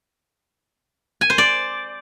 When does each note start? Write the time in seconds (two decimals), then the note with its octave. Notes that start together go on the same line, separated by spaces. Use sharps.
1.21 G#5
1.30 C5
1.38 D5